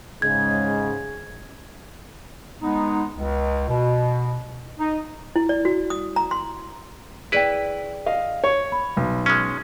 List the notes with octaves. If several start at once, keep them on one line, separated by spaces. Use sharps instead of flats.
G#2 C#3 G#3 G#6
G#3 B3 D#4
C#2
B2
D#4
E4
D5
F#4
D#6
A#5
C6
E4 G#4 B4 D5 G5
D#5 F5
C#5
B5
B1
G#3 C#4